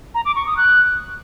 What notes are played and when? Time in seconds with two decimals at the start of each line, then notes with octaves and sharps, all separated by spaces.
0.15 A#5
0.25 D6
0.36 C#6
0.46 D#6
0.57 F#6